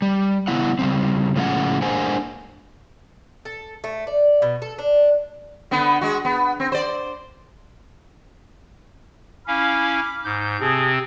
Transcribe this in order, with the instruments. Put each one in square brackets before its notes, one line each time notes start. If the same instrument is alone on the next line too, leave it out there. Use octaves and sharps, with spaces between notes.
[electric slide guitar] G3
C#3 G3 B3 E4 F#5
C#3 G3 C4
A2 C#3 F3 G#3 C#4 F#5
G#3 A#3 D4 C5 F#5 G#5
[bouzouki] A4
A3
D5
B2
A4
D4
[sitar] D3 B3
G#3 F#4
B3
C4
C5 D5
[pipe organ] C#4 E4 F5 [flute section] B5 D6 F6
[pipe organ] G#2 G6
[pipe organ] C3 C4 [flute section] G#4 A5 D#6